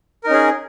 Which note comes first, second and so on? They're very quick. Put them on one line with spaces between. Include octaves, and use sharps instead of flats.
A#4 D#4 C#4 G#4